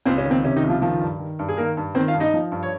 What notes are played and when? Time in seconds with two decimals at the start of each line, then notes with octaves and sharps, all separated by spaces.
0.05 C#2 C4 C5
0.18 C#4
0.25 D#3
0.31 C4
0.44 C3 C#4
0.56 D#3 D#4
0.63 C#2
0.69 F3 F4
0.81 D#3 F3 F4
1.01 G2
1.19 D#3
1.39 G2
1.49 G#4
1.57 D#3 A#3 A#4
1.77 G2
1.95 D#3 C4 C5
2.08 F4 F5
2.14 G2
2.20 D#4 D#5
2.34 F3
2.52 G2
2.63 C#5